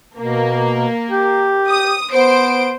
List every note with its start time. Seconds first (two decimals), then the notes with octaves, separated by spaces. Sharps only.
0.18 B2 A#3
1.10 G4
1.68 D#6
2.12 B3 C5 D7